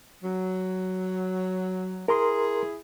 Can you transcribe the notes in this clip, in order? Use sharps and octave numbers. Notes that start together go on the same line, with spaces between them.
F#3
E4 G#4 A#4 A#5 C6